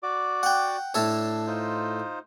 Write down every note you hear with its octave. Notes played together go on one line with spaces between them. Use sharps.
F#4 D5 D6
F#5 G5
A2 D4 A4 C#5
D#4 F4 C5